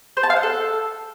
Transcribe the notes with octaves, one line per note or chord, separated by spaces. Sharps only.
C5
A5
F5
F#5
A4